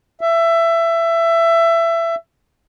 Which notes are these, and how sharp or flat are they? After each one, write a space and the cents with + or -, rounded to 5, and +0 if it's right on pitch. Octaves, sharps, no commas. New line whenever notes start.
E5 +20